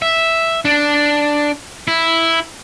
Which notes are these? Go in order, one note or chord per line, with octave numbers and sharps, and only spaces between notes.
E5
D4
E4